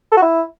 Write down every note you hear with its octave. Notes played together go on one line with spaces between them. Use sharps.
A4
F#4
E4